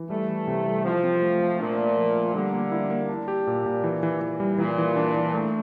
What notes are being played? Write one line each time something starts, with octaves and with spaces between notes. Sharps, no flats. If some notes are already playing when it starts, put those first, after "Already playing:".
Already playing: E3
G3 A3
E3
C3
G3
F3 C4
C4
A3
A3
A#2 D4
A#3
F3
A#3
D3 G3
A#3
E4
A#3
D4
G4
A#2
A#2
E3
E3
E3
G3
A#2 E3
E3
D4
E3
A3